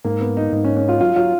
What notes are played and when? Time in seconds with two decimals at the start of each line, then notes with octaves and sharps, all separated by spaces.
0.05 G#2 A#3
0.21 B3
0.37 D#4
0.52 G#2 D#4
0.64 C#4
0.77 C#4
0.89 F4
1.01 F#3 F4
1.16 F#3 F4